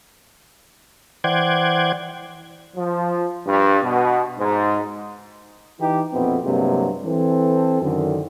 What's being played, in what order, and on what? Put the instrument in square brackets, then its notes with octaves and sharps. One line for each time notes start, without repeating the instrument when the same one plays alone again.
[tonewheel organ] E3 C5 D5 F#5 G5 G#6
[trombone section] F3
G2
B2
G#2
E3 D#4 G4
A#1 F2 B2 B3 C4 E4
G2 C3 F#3 G#3 A#3
E3 C4 A4
F#2 D3 D#3